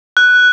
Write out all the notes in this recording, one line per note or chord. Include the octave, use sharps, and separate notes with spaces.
F#6